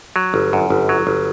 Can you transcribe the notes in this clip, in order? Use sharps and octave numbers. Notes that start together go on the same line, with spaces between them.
F#3
G1
F#2
G1
F#3
G1